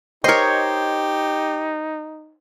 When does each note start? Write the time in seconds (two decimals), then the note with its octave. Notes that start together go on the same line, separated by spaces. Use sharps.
0.24 D#4 G4 A#4 C5 C#5 D#5